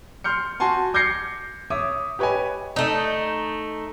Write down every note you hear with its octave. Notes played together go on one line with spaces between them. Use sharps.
C6 F6 G6 C#7
F#4 G#5 A5 C6
D6 G6 G#6 A#6 C7 C#7
C#5 E5 D6 D#6
G4 B4 C#5 D#5 G#5
A3 D#4